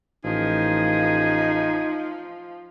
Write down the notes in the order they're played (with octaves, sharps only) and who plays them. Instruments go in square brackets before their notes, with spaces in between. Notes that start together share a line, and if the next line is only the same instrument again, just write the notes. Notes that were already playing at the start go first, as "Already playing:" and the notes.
[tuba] A1 [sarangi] F3 [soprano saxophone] D#4 [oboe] G#4